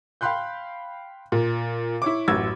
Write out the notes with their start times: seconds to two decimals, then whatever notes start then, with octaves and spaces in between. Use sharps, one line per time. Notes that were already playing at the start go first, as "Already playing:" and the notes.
0.21 F5 G5 B5 C6 F#6 G6
1.32 A#2
2.02 E4 C#5 D6
2.28 A1 F#2 F#4 E6 G#6